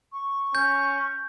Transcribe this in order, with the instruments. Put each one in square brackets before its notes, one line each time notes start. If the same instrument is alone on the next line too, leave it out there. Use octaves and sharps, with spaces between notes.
[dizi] C#6
[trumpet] C#4 [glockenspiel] G6